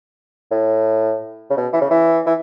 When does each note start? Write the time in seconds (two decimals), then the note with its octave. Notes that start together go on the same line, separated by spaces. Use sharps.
0.51 A2
1.50 C#3
1.57 B2
1.73 E3
1.81 C#3
1.90 E3
2.26 E3